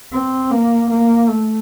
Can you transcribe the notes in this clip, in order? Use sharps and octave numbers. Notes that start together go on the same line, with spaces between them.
C4
A#3
A#3
A3